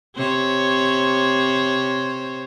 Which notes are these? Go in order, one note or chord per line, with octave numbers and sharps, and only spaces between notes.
C3 C5 C#5